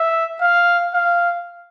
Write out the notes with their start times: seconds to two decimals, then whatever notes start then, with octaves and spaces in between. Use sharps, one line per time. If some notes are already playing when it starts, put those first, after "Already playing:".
Already playing: E5
0.41 F5
0.93 F5